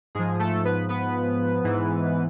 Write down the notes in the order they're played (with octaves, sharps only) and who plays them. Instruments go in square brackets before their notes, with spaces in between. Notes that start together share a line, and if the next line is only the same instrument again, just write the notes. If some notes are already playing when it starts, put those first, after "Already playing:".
[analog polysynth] G#2 F3 G#3 G#4
A3 A4
B3 B4
B3 B4
G#2 E3